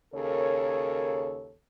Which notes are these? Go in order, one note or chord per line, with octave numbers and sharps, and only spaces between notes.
D#2 C#3 A4 A#4 C#5